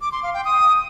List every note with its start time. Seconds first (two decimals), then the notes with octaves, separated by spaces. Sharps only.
0.01 D6
0.12 C6
0.23 F5
0.34 G5
0.45 D#6